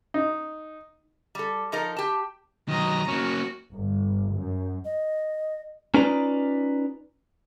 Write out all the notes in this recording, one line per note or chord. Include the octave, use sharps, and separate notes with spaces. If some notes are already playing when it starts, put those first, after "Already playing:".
D#4
G3 A4
F3 D#4 A4 A#4
G4 A5
D#3 F#3 D#5 A#5
A#3 C#4 F#4
G1
F#2
D#5
C#4 D#4 F4 B4 D5 A#5